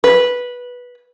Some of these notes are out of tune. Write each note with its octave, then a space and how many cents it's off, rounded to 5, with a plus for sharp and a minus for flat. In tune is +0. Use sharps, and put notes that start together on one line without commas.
B4 -10